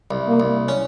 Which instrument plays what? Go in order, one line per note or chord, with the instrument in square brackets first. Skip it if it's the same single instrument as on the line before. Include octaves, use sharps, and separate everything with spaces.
[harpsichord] C2
[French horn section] A#3
[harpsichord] C2
C#4